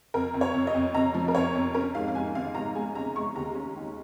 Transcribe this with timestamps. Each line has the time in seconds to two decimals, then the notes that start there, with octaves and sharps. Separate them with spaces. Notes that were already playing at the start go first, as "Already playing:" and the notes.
0.14 F2 A#4
0.34 F2
0.41 C#5
0.54 F2
0.67 D#5
0.75 F2
0.94 F2 A#5
1.14 F3
1.28 A#4
1.34 F2 C#5
1.55 F2
1.74 C#4 A#4
1.95 G#2 F5
2.08 F5
2.15 G#2 G#5
2.35 G#1 F5
2.55 G#2 A#5
2.75 G#3 G#5
2.95 C#4 A#5
3.16 G#3 C#6
3.36 D#2 A#5
3.55 C#4
3.76 D#3